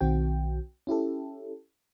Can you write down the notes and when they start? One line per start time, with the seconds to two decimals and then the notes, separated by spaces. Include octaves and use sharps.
0.01 B1 D#3 C4 F#4 G5
0.87 C#4 E4 G4 A4